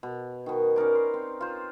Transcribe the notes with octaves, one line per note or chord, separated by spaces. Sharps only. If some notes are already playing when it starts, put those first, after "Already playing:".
B2
B2 D#3
C#4 D#4 A#4 D5
C6
C4
F4 C5